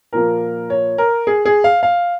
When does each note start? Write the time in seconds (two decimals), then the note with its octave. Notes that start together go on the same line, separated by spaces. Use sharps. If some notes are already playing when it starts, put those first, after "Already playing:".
0.13 A#2 F3 A#3 A#4
0.70 C#5
0.98 A#4
1.27 G#4
1.45 G#4
1.64 F5
1.83 F5